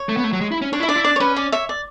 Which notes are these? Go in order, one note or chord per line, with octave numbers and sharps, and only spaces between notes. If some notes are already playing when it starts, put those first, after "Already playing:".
Already playing: C#5
A3
B3
A3
F#3
G#3
E4
C#4
D4 C#5
E4 E5
D4 D5
E4
D4 D5
C#5
C#4 B4
D5
C#5 E5
D5